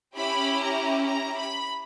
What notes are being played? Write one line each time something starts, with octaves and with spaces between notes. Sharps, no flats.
C#4 E4 G4 B5
A#5
A#5
B5